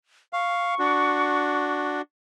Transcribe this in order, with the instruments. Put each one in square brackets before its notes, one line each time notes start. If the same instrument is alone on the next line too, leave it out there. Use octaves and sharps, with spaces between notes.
[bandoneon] F5 [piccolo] C#6
[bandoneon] D4 F#4